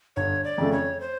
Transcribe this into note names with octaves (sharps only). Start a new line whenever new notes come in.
G1 C#5
D5
F2 C#3 F3 A3
C#5
C5